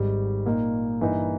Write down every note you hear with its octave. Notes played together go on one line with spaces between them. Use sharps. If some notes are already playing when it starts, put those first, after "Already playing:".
Already playing: G#1 G#2 G3
A#2 A#3 D#4
G2 E3 A#3 D#4